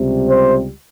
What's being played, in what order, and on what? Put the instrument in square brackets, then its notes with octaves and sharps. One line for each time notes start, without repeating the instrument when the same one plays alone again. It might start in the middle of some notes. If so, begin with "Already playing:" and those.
Already playing: [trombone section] C#2 C3 G3
C5